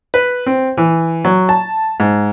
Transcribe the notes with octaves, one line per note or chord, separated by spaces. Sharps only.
B4
C4
E3
F#3
A5
G#2